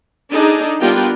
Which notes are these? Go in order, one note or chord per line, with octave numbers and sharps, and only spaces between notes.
D4 D#4 G#4 A4
G3 B3 D4 F4 A#4 G5